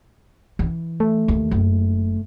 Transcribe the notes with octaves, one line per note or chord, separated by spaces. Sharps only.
E3
A3
D#2
F#1